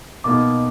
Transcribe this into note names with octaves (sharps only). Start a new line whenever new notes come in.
B2 A#3 D#4 D6